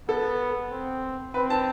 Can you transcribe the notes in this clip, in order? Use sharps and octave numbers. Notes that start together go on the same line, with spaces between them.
B3 A4
C4
C4 B4
A5